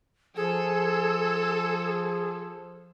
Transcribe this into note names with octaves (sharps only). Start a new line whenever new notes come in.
F3 G#4 A4